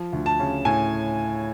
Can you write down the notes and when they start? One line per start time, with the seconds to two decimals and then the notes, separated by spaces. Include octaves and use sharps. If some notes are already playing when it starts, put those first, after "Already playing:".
Already playing: F3
0.13 D2
0.26 A5
0.39 C#3
0.65 A2 G#5